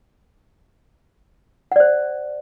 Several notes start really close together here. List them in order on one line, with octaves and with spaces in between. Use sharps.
F#5 D5 C5